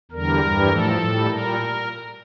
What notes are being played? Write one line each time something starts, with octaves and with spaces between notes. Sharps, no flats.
E2 D3 G3 A#4
G2 E3 G3
A2 F3 A4
A2 G3
A#2 G3 A#4